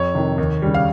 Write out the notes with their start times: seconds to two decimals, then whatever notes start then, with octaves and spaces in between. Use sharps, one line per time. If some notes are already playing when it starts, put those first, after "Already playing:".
Already playing: F2 C#5
0.15 C3 D#3
0.38 D#2
0.62 C#3 G3
0.74 F5